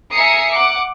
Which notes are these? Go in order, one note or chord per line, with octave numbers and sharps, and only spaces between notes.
E5 G#5 A#5 D#6 C7 C#7
F#5 D6